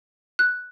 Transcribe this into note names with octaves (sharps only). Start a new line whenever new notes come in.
F#6